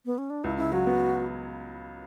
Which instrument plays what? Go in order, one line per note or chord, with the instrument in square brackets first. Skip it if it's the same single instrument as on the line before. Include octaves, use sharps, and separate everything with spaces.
[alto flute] B3
C#4
D4
[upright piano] C#2 [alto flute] E4
[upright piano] C#3 [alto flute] E4
[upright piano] F#3 [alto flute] F#4
[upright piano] B3